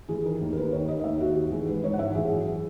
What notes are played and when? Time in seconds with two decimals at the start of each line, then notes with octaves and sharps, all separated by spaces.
0.09 E3 G#4
0.24 D#3 A#4
0.41 D#2
0.53 A#4
0.56 D#2 B4
0.72 D#3 C#5
0.88 D#3 D#5
0.99 D#5
1.04 D#2 E5
1.20 D#2 F#4
1.36 D#3
1.51 E3 G#4
1.68 G#2 B4
1.83 G#2 C#5
1.94 F#5
1.99 E3 E5
2.15 E3 G#4
2.31 F#2
2.46 G#4